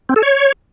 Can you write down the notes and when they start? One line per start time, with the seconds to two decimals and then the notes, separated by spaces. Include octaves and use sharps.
0.09 C4
0.16 A4
0.23 C#5